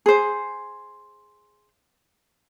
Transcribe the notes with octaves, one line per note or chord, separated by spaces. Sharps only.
G#4 C5